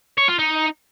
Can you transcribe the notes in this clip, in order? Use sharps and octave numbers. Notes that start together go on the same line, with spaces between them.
C#5
F4
D#4